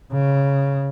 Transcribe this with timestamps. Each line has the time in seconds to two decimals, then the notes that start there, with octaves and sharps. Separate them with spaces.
0.12 C#3